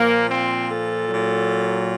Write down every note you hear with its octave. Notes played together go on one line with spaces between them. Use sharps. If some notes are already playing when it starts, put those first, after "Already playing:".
Already playing: A#2 F3 A#3
C4
A4
A#2 F#3